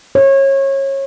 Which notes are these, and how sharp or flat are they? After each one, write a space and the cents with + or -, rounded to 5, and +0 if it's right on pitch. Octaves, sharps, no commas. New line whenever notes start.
C#5 -25